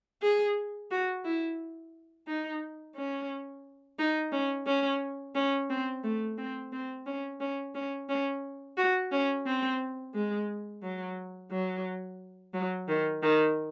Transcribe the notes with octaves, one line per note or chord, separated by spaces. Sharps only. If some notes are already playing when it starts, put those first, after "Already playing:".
G#4
F#4
E4
D#4
C#4
D#4
C#4
C#4
C#4
C4
A3
C4
C4
C#4
C#4
C#4
C#4
F#4
C#4
C4
G#3
F#3
F#3
F#3
D#3
D#3